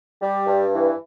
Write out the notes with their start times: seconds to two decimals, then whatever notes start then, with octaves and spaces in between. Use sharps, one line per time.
0.20 G3
0.46 G2
0.72 E3